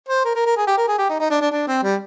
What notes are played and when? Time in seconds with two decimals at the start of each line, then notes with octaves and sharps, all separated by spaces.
0.09 C5
0.25 A#4
0.36 A#4
0.46 A#4
0.57 G#4
0.67 G4
0.78 A#4
0.88 G#4
0.98 G4
1.09 D#4
1.20 D#4
1.30 D4
1.41 D4
1.51 D4
1.68 C4
1.83 G3